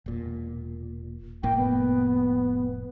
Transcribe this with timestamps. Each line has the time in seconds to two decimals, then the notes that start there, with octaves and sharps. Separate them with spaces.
0.06 E1 A#2
1.43 F1 A2 A#3 G5
1.57 B3